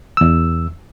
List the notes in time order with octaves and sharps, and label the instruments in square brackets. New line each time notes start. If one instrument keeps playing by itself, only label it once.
[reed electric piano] E2 E6